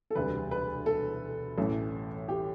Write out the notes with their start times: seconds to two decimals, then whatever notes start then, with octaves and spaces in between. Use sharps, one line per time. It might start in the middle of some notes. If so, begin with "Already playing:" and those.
0.11 A4
0.15 E1 D2 C3 G3 B4
0.51 B4
0.86 A4
1.58 A1 A2 E3
2.28 G4